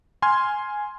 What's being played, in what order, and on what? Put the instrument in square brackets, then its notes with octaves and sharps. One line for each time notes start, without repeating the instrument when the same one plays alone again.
[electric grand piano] G#5 C6 F6 G#6